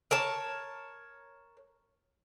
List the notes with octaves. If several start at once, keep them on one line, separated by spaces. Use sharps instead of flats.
A#4 C#5 A5